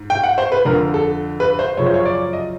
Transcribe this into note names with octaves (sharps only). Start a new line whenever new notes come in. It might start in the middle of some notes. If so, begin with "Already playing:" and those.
Already playing: G#2
G5
F#5
C5
B4
F2 D3 F3 A#4
A4
B4
C5
F#2 C#3 F3 C#5
C5
C#5
D5
D#5